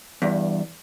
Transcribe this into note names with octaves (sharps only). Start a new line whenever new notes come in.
E2 G2